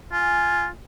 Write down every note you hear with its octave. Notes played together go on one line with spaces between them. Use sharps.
F4 G#5